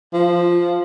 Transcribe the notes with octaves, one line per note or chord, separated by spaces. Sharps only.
F3